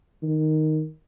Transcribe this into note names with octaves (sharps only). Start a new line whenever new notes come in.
D#3